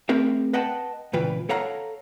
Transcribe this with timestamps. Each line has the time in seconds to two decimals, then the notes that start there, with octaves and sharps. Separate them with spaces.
0.09 A3 C4 G#4 A#4 E5
0.53 B4 D#5 F#5 G5 A5
1.13 C#2 A#2 E3 F4 B4 G5
1.49 A4 C#5 F5 F#5 A#5